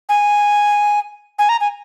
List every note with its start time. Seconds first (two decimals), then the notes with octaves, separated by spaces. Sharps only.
0.09 G#5
1.39 G#5
1.49 A#5
1.60 G#5